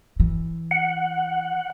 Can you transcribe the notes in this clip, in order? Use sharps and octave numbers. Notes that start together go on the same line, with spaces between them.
E3
F#5